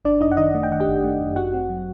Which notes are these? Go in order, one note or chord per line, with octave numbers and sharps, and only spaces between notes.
G1 D4 D5
F#2 D#4 D#5
F#5
D#3 D#4 D#5
A3
G5
D#3 F#5
G4 G5
G1
A3
F#2
G1 F#4 F#5
C4
F#3